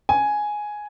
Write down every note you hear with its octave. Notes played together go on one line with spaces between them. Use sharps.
G#5